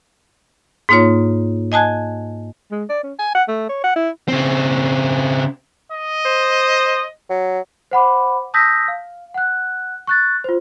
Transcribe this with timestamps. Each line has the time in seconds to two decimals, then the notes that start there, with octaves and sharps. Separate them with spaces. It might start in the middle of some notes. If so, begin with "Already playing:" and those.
0.89 G#2 A#3 D#4 F4 C#5
1.72 D#5 G#5 A5 F#6 G#6
2.71 G#3
2.89 D5
3.04 C#4
3.19 G#5
3.35 F#5
3.49 A3
3.69 C#5
3.84 F#5
3.96 E4
4.28 C#3 C4
5.92 D#5
6.25 C5
7.30 F#3
7.91 C5 F#5 B5 D6
8.54 A5 D#6 E6 G6 A#6 B6
8.88 F5
9.34 F#5 F#6
10.07 C#6 F#6 A6
10.44 F4 C5